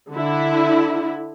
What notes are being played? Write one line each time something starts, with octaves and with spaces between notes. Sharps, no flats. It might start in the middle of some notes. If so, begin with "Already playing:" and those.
D3 E4